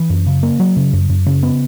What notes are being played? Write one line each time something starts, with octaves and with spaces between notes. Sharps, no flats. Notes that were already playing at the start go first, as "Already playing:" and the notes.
Already playing: E3
F#2
C#3
A#3
F#3
C#3
F#2
F#2
C#3
B3